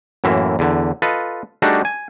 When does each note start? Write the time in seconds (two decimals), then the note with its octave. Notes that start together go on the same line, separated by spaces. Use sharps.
0.24 F#2 A2 E3 A#3 E5
0.59 E2 D3
1.02 F4 A4 B4 D#5
1.62 G3 A3 D4 D#4 F#4 G#4
1.85 G#5